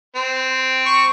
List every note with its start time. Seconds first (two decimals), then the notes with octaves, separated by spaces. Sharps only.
0.16 C4
0.86 C#6